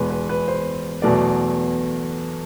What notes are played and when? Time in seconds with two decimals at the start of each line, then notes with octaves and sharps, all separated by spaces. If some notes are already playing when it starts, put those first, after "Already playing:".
Already playing: E2 B2 G#3 B4
0.10 B4
0.29 B4
0.48 C5
1.02 E2 B2 F#3 A3 D5